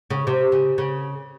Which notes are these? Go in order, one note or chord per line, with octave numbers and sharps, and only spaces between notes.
C#3
C3
C#3
C#3